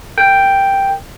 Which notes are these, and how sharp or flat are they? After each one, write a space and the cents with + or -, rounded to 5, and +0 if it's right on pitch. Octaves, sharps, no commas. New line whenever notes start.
A#4 -20 G5 +0